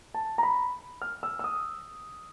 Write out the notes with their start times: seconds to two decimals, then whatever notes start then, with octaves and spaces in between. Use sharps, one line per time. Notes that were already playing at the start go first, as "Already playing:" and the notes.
0.14 A5
0.38 A#5
0.43 B5
1.02 F6
1.23 E6
1.39 E6
1.44 D#6